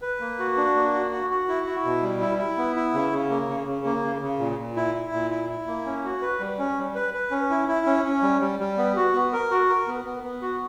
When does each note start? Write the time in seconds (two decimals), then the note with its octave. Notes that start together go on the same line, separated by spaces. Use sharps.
0.02 B4
0.20 A#3
0.39 F#4
0.57 D4
0.75 A#3
0.93 F#4
1.11 F#4
1.30 F#4
1.48 E4
1.67 E4
1.84 B2
2.03 G3
2.21 E4
2.38 E4
2.57 B3
2.76 E4
2.94 C#3
3.12 C#3
3.30 A#3
3.48 C#3
3.67 C#3
3.85 A#3
4.03 C#3
4.22 C#3
4.39 A#2
4.58 A#2
4.76 E4
4.95 E4
5.12 A#2
5.31 E4
5.49 E4
5.67 A#3
5.85 C#4
6.04 F#4
6.22 B4
6.40 G3
6.58 C#4
6.77 G3
6.95 B4
7.14 B4
7.31 C#4
7.50 E4
7.68 E4
7.86 C#4
8.04 C#4
8.22 G3
8.41 G3
8.59 G3
8.77 B3
8.96 F#4
9.14 B3
9.33 A#4
9.51 F#4
9.69 A#4
9.87 B3
10.05 B3
10.24 B3
10.42 F#4